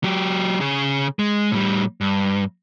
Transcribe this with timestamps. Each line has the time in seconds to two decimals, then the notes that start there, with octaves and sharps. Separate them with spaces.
0.04 F#3 G4
0.61 C#3 G#4
1.19 G#3
1.52 A2 G3
2.01 G2